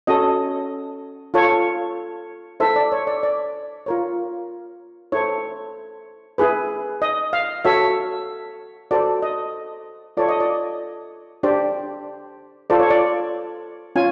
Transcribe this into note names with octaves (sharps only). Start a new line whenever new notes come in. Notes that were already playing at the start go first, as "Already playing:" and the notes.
C#4 F#4 A4 D#5
F4 A4 C#5
E4 A4 C5 E5
D5
C#5
D5
D5
F4 A#4 C#5
E4 A4 C5 C#5
E4 G#4 B4
D#5
F5
F#4 A4 C#5 E5
F#4 A4 C5 D5
D#5
F4 A4 C#5 D5
D#5
D5
D4 G4 C5 D5
F4 A4 C5 D5
C#5
D5
C#4 F4 G#5